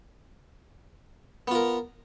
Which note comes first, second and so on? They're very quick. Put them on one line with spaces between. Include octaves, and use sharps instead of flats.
B3 F4 A#4